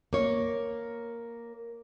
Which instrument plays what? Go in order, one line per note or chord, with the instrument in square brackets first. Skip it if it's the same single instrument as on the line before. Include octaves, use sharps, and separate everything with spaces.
[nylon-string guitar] A#3 C#5